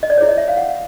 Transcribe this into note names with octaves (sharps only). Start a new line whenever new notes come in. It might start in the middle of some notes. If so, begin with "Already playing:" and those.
D#5
D5
E4 G#4 C#5
D#5
E5
F5
F#5